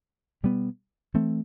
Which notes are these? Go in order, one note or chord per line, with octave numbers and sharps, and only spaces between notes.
B2 G3 B3
E3 A3 C4